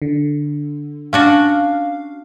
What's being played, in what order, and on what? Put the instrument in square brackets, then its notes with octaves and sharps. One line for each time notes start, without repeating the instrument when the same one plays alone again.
[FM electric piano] D3
[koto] C#4 D4 F#4 [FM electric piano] F5